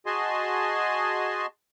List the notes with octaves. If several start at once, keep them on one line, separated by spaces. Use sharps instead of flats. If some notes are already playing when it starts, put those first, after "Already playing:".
F#4 G#4 D#5 G#5 A5 C6